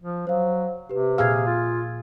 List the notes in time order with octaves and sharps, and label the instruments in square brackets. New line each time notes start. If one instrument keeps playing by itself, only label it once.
[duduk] F3
[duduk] F#3 [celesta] C5 F5
[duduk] C3 [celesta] G4 B4
[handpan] A#2 G#4 F5 [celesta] E6 G#6
[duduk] F4